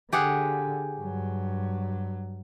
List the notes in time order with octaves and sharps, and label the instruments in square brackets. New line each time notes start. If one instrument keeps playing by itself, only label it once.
[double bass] D3 [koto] G4 G#4 F#5
[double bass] G2 F#3